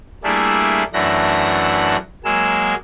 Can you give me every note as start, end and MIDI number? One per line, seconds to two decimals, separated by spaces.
0.24 0.83 55
0.24 0.83 57
0.24 0.83 58
0.24 0.83 62
0.24 0.83 64
0.24 0.83 68
0.93 1.97 42
0.93 1.97 52
0.93 1.97 57
0.93 1.97 62
0.93 1.97 78
0.93 1.97 94
2.25 2.75 54
2.25 2.75 56
2.25 2.75 58
2.25 2.75 68
2.25 2.75 88